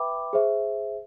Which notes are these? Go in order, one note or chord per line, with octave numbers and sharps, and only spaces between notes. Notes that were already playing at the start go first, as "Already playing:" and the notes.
Already playing: B4 E5 G5 B5 D6
G#4 C5 E5